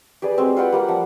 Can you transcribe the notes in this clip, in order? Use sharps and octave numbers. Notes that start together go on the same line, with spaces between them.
G4 G#4 B4 D5
G#3 C4 F#4
F4 B4 F#5 G5
G3 A#3 F#5
F3 F#5